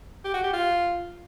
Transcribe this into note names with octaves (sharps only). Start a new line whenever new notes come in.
G4
F#4
G4
F4